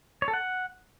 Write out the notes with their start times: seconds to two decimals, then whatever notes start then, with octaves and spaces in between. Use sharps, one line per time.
0.22 C#5
0.28 A4
0.34 F#5